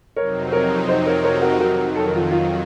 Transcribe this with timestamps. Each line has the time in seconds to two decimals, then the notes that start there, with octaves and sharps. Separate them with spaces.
0.16 F2 C3 F#3 C4 D#4 A#4 C#5
0.52 A#4 C#5
0.88 C5 D#5
1.06 A#4 C#5
1.24 A#4 C#5
1.42 F#4 A#4
1.60 F2 D#3 F#3 F#4 A#4
1.95 A4
2.06 A#4
2.15 F4 A4
2.31 F4